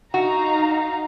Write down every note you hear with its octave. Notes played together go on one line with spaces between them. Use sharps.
D#4 F#4 F5 A#5